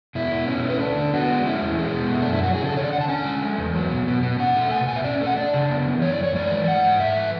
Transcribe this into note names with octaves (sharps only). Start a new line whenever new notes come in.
B2 E4
B2
C#4 E4
E4
A3 B4
D4
D3
B3 F#4
G#3
C#4 E4
E2
G#3
B2
A3
D4
F#2
E4
F#3 F#4
G#4
C#3
A4
D3 C#5
D5
D3 F#5
A5
C#4 G#5
G#3
A3
E2
F#3
B2
B2
B2
C#4 F#5
A3
B2 G#5
B2 G#5
E5
C#4 D5
A3
F#5
D4 D5
C#3
B3
E3
F#2 C#5
D5
F#2 C#5
G#3 D5
E3
G#2 F#5
G#2
A3 E5
E3